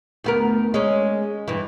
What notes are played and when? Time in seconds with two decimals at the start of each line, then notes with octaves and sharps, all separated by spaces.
0.24 D2 B3 A#4
0.74 G#3 C#4
1.48 G2 E3